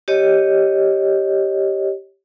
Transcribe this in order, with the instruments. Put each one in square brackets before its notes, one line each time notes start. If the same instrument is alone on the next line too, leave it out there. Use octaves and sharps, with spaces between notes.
[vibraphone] G4 C#5 D#5